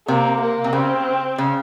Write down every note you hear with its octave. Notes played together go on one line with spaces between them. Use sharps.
C3 A#3
A#3
C3
C#3 C4
C#3